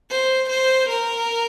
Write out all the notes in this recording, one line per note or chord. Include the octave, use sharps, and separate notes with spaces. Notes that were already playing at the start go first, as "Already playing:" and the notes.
C5
C5
A#4